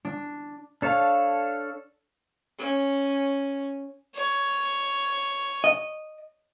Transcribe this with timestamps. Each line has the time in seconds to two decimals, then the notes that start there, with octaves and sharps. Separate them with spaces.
0.05 D4
0.82 D4 A4 C#5 F5
2.58 C#4
4.15 C#5
5.64 D#5